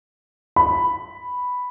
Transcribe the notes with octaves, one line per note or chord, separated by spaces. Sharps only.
B5